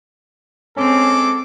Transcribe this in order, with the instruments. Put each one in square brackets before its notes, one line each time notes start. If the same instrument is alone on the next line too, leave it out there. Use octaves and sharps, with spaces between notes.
[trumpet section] G#3 A4 D6 [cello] C4 [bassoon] C#4